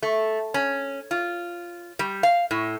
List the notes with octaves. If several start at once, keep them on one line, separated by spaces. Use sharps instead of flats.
A3
C#4
F4
G3
F5
A2